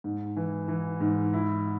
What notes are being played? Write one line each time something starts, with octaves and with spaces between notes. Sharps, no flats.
G#2
E3
E3
G#2
E4